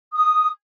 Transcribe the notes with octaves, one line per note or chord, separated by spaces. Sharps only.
D#6